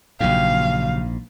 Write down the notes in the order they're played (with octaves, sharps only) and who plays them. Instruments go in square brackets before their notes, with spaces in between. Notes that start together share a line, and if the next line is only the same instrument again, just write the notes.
[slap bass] A#1 G#2 [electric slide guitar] C#3 F#3 G4 [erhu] F5